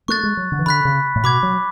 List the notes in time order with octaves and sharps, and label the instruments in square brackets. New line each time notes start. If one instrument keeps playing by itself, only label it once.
[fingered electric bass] A3 [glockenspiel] C#6 F#6 A6
[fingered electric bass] G#3
F#3
D3
E3
[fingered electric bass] D3 [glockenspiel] B5 F#6 B6
[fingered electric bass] C#3
A2
[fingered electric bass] B2 [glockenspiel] B5 D6 G#6
[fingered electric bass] F#3